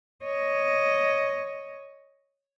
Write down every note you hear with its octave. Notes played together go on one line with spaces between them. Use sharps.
C#5 D#5